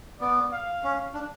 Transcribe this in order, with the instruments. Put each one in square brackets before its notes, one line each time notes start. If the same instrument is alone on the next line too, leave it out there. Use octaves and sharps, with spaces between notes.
[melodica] B3 [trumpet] D5
[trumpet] F5
[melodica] C#4
D4